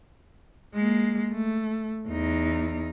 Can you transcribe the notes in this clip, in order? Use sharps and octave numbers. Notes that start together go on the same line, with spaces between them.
G#3 A#3
A3
E2 D#4